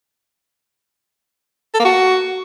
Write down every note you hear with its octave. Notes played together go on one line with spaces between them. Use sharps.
A4
A#3
F#4